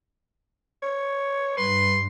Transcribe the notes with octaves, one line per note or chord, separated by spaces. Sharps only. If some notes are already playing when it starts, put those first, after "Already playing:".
C#5
G2 B4 C6